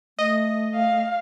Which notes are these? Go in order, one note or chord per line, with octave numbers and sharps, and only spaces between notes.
A3 D#5
F5